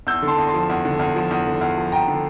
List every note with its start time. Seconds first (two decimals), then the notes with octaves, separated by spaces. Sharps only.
0.07 E2 E6 G6
0.22 D3
0.28 A5 C6
0.38 E2
0.49 F3 A5 C6
0.70 E2
0.85 D3
0.99 E2
1.16 F3
1.31 E2
1.47 D3
1.61 E2
1.78 F3
1.92 E2 G5 A#5
2.08 D3